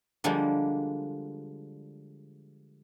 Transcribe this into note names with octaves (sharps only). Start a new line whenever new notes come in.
D3 F3 G3 G#3 A#3